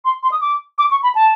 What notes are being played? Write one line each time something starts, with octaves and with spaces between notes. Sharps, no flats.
C6
C6
D#6
D6
D6
C#6
B5
A5